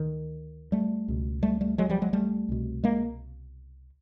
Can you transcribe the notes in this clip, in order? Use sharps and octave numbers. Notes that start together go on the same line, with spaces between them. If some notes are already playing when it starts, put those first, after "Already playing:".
Already playing: D2 D#3
G3 A3
C#2 B2
G3 A3
G3 A3
F#3 G#3
F3 G3
F#3 G#3
G3 A3
C2 B2
G#3 A#3